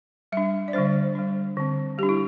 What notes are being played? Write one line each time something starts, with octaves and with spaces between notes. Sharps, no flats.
G3 D4 E5
D5
D3 G3 D4 C5
G3 D4
D3 C4
G3 D4 G4
E4